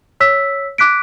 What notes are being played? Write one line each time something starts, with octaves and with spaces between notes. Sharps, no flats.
C#5 E6 B6
D6 F#6 B6 D7